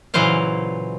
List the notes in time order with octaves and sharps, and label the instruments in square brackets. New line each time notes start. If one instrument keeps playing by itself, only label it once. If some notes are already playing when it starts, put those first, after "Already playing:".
[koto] A#2 C#3 E3 F#3 C5 F5